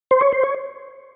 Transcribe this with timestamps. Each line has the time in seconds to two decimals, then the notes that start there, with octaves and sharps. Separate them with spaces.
0.11 C5
0.21 C#5
0.33 C5
0.43 C#5